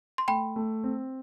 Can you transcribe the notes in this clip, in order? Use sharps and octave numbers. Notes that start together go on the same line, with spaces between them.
C6
A3 G5 B5
A3
C4